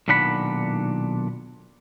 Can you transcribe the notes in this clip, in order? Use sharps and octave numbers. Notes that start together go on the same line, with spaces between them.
B1 A#2 D#3 D4 F#5 B5